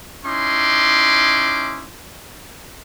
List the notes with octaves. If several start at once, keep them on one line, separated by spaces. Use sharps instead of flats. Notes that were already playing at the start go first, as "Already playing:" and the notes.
C#4 D#4 E4 C6 D6